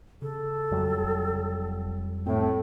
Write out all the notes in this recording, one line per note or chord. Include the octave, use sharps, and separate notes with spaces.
C#3 A4
F2 F#3 G3
F1
A2 C4 G5